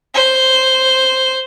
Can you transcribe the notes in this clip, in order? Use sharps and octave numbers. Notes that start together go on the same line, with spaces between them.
C5